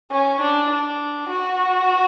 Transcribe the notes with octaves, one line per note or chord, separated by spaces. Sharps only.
C#4
D4
D4
F#4